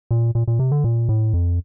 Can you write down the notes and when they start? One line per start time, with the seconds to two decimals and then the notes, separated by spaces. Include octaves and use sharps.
0.11 A#2
0.35 A#2
0.48 A#2
0.59 C3
0.72 D3
0.84 A#2
1.09 A2
1.34 F2